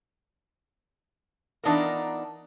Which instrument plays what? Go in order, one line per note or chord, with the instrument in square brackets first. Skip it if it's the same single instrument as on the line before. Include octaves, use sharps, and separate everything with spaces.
[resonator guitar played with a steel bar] E3 B3 D4 D#4 F4 A#4